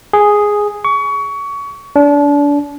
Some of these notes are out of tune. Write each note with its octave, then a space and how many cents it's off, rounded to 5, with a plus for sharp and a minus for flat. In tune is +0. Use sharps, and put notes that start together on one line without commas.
G#4 +0
C#6 +25
D4 -30